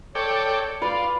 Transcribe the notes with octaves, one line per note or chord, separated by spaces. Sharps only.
A4 C#5 D5 G5
F4 B4 D5